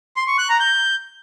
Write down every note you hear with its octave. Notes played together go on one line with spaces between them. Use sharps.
C6
C#6
F#6
A#5
G6